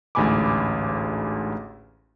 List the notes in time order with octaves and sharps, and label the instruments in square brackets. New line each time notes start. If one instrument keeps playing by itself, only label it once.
[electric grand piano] A1 D2 G#2 G#5 B5 D6